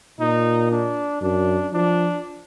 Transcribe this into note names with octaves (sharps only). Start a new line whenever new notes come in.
A#2 D#4
D4
F#2 D4
F3 D4